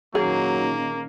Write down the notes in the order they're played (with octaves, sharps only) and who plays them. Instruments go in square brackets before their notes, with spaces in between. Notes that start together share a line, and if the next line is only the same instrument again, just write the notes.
[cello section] A#2 D#3 C#4 [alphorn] F#3 [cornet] A#3 [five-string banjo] G#4